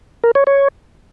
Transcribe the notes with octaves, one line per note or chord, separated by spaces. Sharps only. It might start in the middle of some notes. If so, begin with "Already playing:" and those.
A#4
C#5
C#5